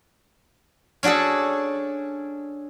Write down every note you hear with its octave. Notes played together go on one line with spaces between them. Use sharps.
C#4 D4 F#4 G#4 A4